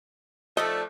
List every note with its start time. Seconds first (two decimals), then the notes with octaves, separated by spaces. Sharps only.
0.57 F3 A3 D4 D#4 A4 D#5